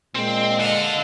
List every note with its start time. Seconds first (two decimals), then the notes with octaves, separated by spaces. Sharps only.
0.15 A#2 G#3 C4
0.60 D3 A4 D#5 F5